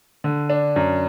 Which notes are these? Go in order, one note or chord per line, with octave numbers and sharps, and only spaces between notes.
D3
D4
F#2